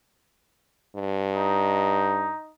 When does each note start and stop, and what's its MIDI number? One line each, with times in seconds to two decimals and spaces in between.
0.96 2.32 43
1.34 2.49 63